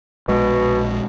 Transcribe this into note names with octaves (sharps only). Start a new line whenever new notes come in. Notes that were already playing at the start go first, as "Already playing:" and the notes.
A#1 B2 G#3